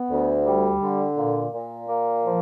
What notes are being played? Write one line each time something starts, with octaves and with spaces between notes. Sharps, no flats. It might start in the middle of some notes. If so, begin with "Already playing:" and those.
Already playing: B3
D2
G3
D3
A#2
A#2
A#3
F3